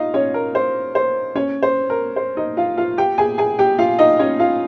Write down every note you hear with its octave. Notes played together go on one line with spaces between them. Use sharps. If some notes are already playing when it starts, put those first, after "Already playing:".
Already playing: D#4 F4 D#5 F5
C#4 C#5
A#4
C5
C5
C#4 C#5
C5
A#4
C5
D#4 D#5
F4 F5
F4 F5
G4 G5
G#4 G#5
G#4 G#5
G4 G5
F4 F5
D#4 D#5
C#4 C#5
F4 F5